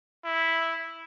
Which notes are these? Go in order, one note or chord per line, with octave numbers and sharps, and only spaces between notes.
E4